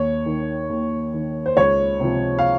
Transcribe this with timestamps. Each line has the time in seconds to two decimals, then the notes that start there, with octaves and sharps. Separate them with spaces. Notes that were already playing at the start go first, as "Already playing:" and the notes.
Already playing: D#2 C#5
0.26 D#3
0.70 D#2
1.13 D#3
1.46 C5
1.57 C#2 C#5
2.00 C3 F3
2.39 F5